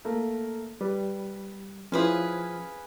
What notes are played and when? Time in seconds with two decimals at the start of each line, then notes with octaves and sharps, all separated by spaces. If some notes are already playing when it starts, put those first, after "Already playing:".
0.05 A3 A#3
0.81 G3 B4
1.92 F3 C#4 E4 G#4 B4 C5 F5